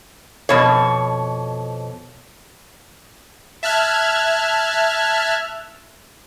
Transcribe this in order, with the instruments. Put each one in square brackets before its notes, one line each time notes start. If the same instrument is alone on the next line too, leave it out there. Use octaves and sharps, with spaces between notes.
[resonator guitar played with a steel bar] F2 B2 C#5
[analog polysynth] E5 A5 F6 F#6 G#6